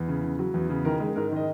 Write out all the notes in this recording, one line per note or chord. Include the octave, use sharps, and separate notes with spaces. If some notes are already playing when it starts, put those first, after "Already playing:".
Already playing: E2
C#3
C#3
F#3
E2
C#3
D#3 A#4
G#3
G#2 A#4
D#3 D#5